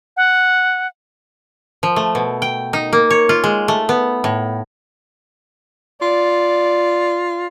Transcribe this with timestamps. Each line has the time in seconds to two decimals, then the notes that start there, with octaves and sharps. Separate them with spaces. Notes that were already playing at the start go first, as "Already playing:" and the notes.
0.17 F#5
1.83 F3
1.96 A3
2.15 B2
2.42 G5
2.73 D#4
2.93 A#3
3.10 C#5
3.29 F4
3.44 G#3
3.68 A3
3.89 B3
4.24 A2
6.02 F4 D5